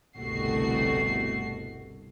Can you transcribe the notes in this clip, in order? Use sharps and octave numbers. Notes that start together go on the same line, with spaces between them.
G1 C2 B2 A3 F#4 C7